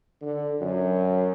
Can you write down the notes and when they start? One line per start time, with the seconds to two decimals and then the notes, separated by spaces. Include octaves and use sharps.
0.21 D3
0.61 F#2